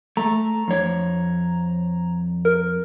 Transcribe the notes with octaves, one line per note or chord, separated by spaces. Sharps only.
A3 A#5
F2 C#5
A#4